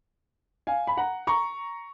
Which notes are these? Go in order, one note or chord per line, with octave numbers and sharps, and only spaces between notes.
F5 G#5
B5
F#5 A#5
A#5 C#6